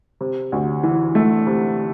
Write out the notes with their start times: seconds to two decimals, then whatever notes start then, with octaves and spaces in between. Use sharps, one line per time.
0.21 C3
0.52 D2
0.83 E3
1.15 A3
1.47 C3